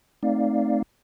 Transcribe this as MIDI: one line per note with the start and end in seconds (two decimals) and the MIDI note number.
0.23 0.82 57
0.23 0.82 60
0.23 0.82 63
0.23 0.82 74
0.23 0.82 77